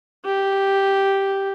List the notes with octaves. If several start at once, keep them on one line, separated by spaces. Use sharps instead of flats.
G4